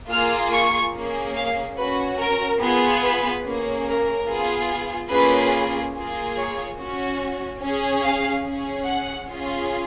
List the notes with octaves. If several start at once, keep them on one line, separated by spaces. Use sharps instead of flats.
A#3 F4 G#4 F6
C#6
A#3 C#4 G#4
F5
C#4 F#4 B4
A#4
B3 F4 G#4
B4
A#3 C#4 G#4
A#4
B3 F4 G#4
A#3 C#4 F4 G#4 B4
A#3 F4 G#4
C#5
C#4 F#4
C#4 G#4
F5
C#4 G#4
F#5
C#4 F4 G#4